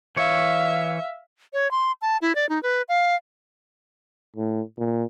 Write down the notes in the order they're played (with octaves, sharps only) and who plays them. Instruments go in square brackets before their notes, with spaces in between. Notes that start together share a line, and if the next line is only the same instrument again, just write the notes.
[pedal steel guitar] E3 C#5 [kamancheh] E5 F5
[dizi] C#5
C6
A5
E4
D5
D#4
B4
F5
[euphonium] A2
A#2